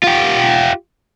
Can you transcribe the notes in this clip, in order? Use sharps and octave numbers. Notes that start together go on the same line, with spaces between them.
F4 G4